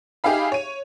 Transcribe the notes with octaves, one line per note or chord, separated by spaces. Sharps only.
D#4 G4 G#4 E5 F5 B5
C#5 D#7